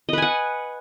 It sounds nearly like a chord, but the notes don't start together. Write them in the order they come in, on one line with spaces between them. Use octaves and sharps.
D#5 B4 G#5 F#5